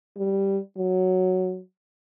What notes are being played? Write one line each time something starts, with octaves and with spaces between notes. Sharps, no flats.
G3
F#3